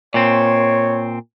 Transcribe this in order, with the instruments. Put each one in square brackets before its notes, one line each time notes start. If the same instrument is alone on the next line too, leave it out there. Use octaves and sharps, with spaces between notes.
[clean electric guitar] A#2 C4 [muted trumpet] C#5